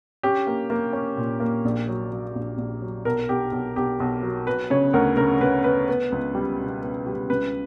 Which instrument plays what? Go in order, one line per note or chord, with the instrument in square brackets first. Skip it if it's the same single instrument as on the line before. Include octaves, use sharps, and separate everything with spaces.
[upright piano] C#4 G4
A#3
A#3
C#4
A#2
A#3
A#1
F#3
F#3
A#1
A#1
F#3
B1 A#4
B1 G4
B1
B1 G4
B1
F#3
B3 B4
C#3 C#5
D2 A#4
C#3 A#4
C#3 B4
B3 B4
B3
C#2
G3
B2
B3
G3
C#2 B4